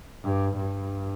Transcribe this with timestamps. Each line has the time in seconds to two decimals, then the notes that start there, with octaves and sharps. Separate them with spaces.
0.23 G2
0.56 G2